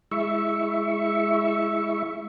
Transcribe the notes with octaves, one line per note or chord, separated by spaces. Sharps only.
G#3 E4 E5 C#6